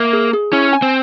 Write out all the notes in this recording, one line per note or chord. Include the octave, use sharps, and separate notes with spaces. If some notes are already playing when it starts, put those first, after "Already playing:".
Already playing: A#3 E5
G#4
G#4
C#4 E4
G#5
C4